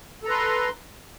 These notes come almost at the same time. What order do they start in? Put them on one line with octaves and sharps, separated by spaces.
A4 A#5 B4 C6